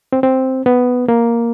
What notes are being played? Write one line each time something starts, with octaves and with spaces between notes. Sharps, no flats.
C4
C4
B3
A#3